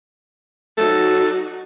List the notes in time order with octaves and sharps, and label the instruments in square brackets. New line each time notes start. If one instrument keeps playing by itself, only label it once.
[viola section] F#3 D#4 F#4 [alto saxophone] A4